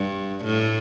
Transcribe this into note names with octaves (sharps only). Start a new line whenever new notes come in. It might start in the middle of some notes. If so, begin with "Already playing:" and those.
Already playing: G2
A2